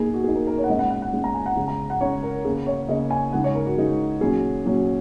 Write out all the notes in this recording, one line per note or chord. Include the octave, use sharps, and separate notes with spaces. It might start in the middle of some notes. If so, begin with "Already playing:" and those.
Already playing: A#2 A#3 D#4 G#4
F#4
A#2 A#3 D#4 G#4
A#4
A#4
C#5
F#5
A#2 G#3 C#4 D#5
F#5
F#5
F#5
A#2 G#3 C#4
A#5
G#5
F#5
C#3 G#3 C#4
A#5
F#5
C#3 G#3 C#4 C#5
A#4
C#3 A#3 C#4 G#4
C#5
C#3 A#3 C#4 D#5
G#5
C#3 G#3 D#4 F#5
C#5
A#4
F#4
C#3 G#3 D#4
A#2 F#3 C#4 G#4
A#2 F#3 C#4